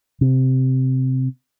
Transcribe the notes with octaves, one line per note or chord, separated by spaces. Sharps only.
C3